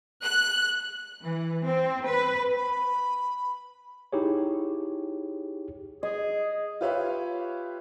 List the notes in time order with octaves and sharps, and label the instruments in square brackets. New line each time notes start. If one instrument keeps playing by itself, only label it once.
[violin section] F#6
[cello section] E3
C4
B4
[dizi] B5
[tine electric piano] D#4 E4 G4 G#4 C#5
[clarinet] G#4 [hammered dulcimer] D#5
[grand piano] F4 G4 B4 C#5 E5 F5